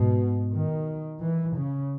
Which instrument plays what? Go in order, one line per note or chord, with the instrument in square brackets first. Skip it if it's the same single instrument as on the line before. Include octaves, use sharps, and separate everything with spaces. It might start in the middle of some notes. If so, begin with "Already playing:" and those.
Already playing: [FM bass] G#2 [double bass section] B2
[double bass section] D#3
E3
C#3